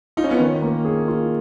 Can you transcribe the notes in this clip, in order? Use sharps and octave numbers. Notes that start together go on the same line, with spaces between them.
D#4 F4
C#4
B3
D#3 C#4
A#3
G#4
F4